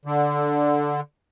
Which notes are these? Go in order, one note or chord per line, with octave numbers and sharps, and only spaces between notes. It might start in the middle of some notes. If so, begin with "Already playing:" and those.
D3